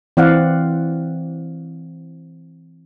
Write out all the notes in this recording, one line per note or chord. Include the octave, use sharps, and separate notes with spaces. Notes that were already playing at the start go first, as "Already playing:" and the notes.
E3 C4 D5 F5 F#5